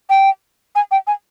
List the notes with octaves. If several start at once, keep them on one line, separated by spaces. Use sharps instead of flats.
G5
G#5
G5
G#5